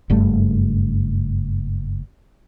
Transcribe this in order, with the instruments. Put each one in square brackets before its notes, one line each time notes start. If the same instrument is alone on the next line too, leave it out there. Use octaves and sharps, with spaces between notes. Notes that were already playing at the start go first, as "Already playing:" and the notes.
[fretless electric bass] F#1 G2 A3